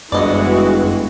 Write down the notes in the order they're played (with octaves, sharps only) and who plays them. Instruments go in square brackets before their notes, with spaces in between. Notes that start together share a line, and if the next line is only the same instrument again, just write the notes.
[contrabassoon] G1 [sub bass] F#2 [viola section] E3 G#3 F#4 [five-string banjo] D5 D#5